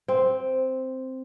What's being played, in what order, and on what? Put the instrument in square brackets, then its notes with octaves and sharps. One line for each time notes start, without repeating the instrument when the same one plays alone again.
[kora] C4